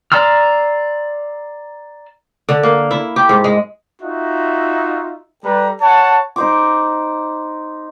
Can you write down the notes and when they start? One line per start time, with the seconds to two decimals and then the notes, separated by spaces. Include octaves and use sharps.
0.12 D5 A#5 C6 E6 F6
2.49 D3
2.63 A#3
2.91 E4
3.16 G4
3.29 G#2
3.44 G#3
4.02 D#4 F4 F#4 E5
5.44 G3 A4 B4 D5 A#5
5.82 C#5 F#5 A5
6.36 D#4 C5 D6